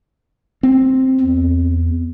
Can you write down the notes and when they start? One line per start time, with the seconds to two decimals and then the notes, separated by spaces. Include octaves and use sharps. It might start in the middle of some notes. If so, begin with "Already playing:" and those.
0.63 C4
1.20 E2